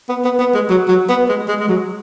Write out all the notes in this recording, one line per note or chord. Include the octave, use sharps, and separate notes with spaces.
B3
B3
B3
G#3
F#3
F#3
B3
G#3
G#3
G#3
F#3